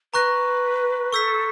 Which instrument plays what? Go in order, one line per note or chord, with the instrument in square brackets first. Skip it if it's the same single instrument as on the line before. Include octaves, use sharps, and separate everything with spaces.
[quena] B4 [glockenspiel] A#5 C#6 F#6 A#6
[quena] A4 [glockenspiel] C#6 E6 G6 B6